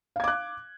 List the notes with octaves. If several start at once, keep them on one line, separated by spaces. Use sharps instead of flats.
F5 D6 F#6 G#6